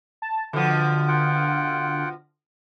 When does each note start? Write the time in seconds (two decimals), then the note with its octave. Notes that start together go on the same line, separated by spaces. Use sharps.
0.22 A5
0.53 B2 D3 F3
1.08 F4 F#5 G5